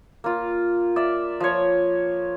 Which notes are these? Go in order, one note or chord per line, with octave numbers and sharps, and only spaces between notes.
A#3 F4
D5 E5
F3 C#5